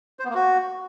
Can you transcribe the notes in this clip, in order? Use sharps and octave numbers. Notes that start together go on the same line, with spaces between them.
C5
B3
A#3
F#4